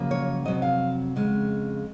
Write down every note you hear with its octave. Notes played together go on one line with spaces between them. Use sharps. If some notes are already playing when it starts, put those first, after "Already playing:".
Already playing: F#2 C#3 F3 A#3
C#5
F2 C3 F#3 D#5
F5
F2 C#3 G#3